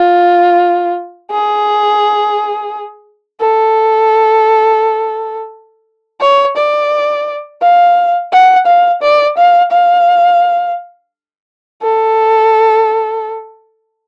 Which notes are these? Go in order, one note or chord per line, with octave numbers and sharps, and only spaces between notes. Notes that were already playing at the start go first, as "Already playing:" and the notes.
Already playing: F4
G#4
A4
C#5
D5
F5
F#5
F5
D5
F5
F5
A4